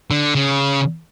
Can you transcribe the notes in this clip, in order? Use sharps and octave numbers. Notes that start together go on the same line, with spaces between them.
D3
C#3